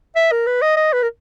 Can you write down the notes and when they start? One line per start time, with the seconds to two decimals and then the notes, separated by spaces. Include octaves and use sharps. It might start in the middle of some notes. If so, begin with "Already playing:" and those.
0.16 E5
0.32 A#4
0.47 B4
0.62 D#5
0.77 D#5
0.93 B4
1.02 A#4